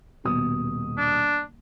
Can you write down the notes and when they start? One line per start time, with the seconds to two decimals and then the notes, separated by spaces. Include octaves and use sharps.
0.24 D#1 B2 D#6
0.97 D4